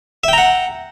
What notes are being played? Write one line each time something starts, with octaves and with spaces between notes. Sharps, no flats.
E5 F#5 G5 A#5